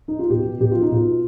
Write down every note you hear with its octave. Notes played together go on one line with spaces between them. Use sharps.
D#4
F4
B2 G4
B2
B2 G4
B2 F4
D#4
B2 F4